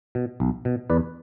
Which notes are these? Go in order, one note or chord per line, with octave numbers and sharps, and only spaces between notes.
B2
B1
B2
E2 B4 D5